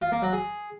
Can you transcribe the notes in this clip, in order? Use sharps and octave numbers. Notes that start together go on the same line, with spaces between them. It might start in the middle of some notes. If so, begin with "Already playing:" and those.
F4
A#3
F#3
G#4